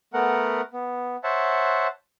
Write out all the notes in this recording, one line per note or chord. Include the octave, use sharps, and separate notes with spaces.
A3 B3 A#4 F#5
B3
C5 C#5 E5 F#5 A5